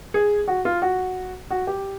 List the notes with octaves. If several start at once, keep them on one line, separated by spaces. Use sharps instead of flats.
G#4
F#4
F4
F#4
F#4
G4